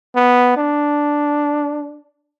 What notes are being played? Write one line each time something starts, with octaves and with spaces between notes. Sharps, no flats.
B3
D4